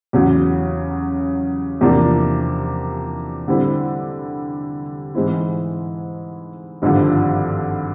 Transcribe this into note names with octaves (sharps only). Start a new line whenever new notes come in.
E2 C#3 F#3
E2 C3 F3 A#3 D4
D3 G3 C4 E4
G#2 E3 G#3 C4 E4
G#1 G2 D3 F3